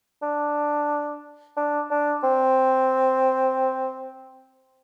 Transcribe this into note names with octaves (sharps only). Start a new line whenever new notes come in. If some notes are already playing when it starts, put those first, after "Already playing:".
D4
D4
D4
C4